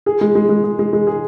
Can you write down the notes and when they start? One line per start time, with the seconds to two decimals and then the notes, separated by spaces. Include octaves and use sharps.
0.06 G#4
0.21 G#3
0.35 G#3
0.49 G#3
0.64 G#3
0.79 G#3
0.93 G#3
1.07 G#4